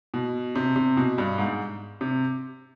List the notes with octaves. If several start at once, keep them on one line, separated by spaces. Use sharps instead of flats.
B2
C3
C3
B2
G2
G#2
C3